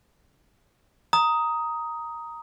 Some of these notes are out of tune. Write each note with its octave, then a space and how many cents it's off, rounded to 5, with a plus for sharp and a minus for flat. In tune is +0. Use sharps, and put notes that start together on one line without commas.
A#5 +0 D#6 +10